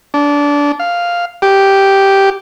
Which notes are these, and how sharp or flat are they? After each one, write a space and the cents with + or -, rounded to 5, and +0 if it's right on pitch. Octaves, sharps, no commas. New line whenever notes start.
D4 -20
F5 +0
G4 -5